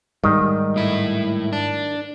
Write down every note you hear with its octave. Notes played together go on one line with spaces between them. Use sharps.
G#2 D#3 G3
A2 E4
D4